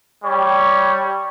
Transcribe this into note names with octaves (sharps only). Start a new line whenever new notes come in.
G3 C#5